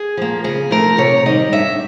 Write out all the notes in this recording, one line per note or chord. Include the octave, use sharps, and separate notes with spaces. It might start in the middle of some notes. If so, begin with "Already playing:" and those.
Already playing: G#4
F3 A#3
C#3 G#4
F3 A3 A#4
C3 C#5
D#3 G3 D#5
G2 E5